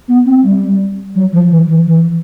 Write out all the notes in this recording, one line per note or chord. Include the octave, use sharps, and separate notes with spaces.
B3
C4
G3
F#3
F3
E3
E3
E3